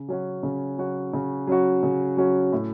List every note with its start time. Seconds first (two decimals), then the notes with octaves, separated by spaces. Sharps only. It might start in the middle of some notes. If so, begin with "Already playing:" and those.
Already playing: C#3
0.08 F#3 C#4 F#4
0.43 C#3
0.78 F#3 C#4 F#4
1.13 C#3
1.47 F#3 C#4 F#4
1.83 C#3
2.17 F#3 C#4 F#4
2.53 A2